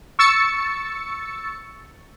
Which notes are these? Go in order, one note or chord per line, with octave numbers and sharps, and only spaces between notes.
C#6 E6 A6 C#7